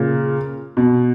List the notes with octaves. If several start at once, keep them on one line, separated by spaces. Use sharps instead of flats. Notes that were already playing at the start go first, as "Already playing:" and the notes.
Already playing: A#2 C#3
B2